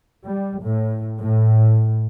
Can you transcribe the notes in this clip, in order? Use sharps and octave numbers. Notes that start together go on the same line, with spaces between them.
G3
A2
A2